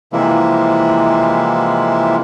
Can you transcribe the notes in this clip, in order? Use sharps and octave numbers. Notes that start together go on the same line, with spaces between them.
C3 E3 F3 G#3 A#3 E4